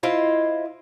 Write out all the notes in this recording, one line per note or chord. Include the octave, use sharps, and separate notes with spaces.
E4 F4 C5 D#5